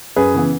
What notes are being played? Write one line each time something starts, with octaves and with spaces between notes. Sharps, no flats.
F#2 G#4 B4
C#3 E3 B3